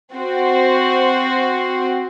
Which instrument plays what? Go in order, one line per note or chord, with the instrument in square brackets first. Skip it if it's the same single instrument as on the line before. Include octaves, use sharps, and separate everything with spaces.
[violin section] C4 F#4 C5